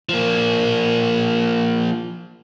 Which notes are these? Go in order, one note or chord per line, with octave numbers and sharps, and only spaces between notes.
F3 A#3